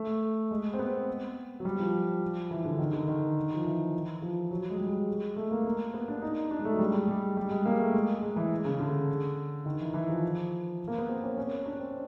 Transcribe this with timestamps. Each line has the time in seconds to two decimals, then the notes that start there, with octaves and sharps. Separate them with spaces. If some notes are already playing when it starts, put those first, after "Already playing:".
Already playing: A3
0.51 G#3
0.74 C4
0.79 B3
1.60 F#3
1.65 G3
1.79 F3
2.51 E3
2.65 D3
2.79 D#3
2.93 D3
3.08 D#3
3.54 F3
3.65 E3
4.22 F3
4.51 F#3
4.70 G#3
4.78 G3
4.86 G#3
5.36 A3
5.51 A#3
5.65 A#3
5.94 B3
6.08 D4
6.22 D#4
6.51 D4
6.59 G#3
6.65 A3
6.73 F#3
6.79 G3
6.95 G#3
7.08 G3
7.37 G3
7.51 G#3
7.66 A#3
7.79 A3
7.94 G#3
8.22 G#3
8.36 E3
8.65 C#3
8.80 D3
9.66 D#3
9.80 E3
9.94 E3
10.09 F3
10.88 A#3
10.98 B3
11.09 C4
11.23 C#4
11.37 C#4
11.66 D4
11.80 C4